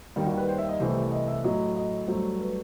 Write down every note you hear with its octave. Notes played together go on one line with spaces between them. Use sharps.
D#2 D#3 G3
F#4
B4
C5
E5
D#5
C2 C3 E3 A3 C5
D#5
E5
A2 F#3 A3 D#5
D#5
G2 F#3 A3 C5
B4